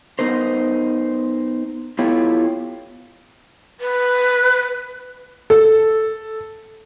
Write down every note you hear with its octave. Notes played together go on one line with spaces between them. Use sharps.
B3 D#4 A#4 C5
B3 E4 F4 G4 A4 C#5
B4
A4